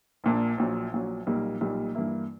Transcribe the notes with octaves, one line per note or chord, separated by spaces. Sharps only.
A#1 A#2 A#3 D4
A#1 A#2 F#3
A#1 A#2 F#3
B1 A#2 G3 A#3
B1 A#2 G3 A#3
G2 E3 A#3 E4